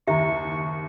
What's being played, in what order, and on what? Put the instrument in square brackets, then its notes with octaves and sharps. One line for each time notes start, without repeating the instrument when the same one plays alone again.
[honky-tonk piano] F#1 D#2 [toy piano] E4 E5 [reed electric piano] G4 [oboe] C#6